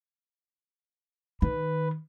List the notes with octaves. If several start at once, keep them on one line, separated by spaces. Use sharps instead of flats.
D#3 B4